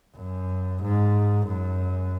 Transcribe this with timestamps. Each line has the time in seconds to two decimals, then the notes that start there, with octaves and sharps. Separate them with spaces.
0.16 F#2
0.82 G#2
1.47 F#2